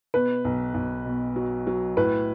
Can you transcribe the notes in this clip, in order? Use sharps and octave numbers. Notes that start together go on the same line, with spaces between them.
B2 B4
B1
B1
B2
F#3
F#3
A2 B4